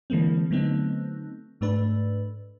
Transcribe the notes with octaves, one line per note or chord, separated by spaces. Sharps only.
D3 E3 G#3 A#3 C4
D3 F#3 A3 B3 C4 D#4
G#2 A3 D4 B4